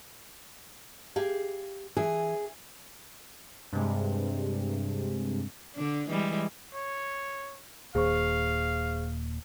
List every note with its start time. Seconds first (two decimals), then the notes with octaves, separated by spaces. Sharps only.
1.16 G4 G#4 F5
1.97 E3 G#4
3.72 G2 C3 G#3
5.75 D3 D4
6.09 E3 G3 G#3
6.74 C#5
7.95 D#1 D#2 A#2 G#4 C5 F5 C#6